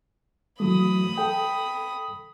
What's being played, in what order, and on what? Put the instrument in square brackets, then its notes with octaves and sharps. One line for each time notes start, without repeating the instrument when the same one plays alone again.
[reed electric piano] E3 F#3 A3 [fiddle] B5 D#6
[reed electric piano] A4 G5